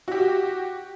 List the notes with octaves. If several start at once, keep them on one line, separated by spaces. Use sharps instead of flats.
F#4 G4